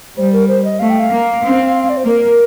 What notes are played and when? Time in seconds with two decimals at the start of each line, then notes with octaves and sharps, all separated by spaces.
0.17 G3 C5
0.32 A#4
0.48 C5
0.64 D#5
0.79 A3 F5
0.90 G5
0.99 F5
1.11 A#3
1.42 C4
1.89 D5
1.97 C5
2.06 A#3 A#4